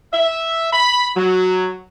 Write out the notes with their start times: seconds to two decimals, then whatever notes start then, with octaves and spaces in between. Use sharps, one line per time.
0.13 E5
0.73 B5
1.17 F#3